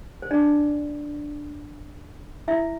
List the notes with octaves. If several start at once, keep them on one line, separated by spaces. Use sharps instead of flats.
C5
D4 D5
E4 E5